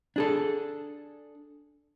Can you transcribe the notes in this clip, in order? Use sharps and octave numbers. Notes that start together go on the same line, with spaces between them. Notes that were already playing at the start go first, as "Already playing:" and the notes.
D4 G#4 A4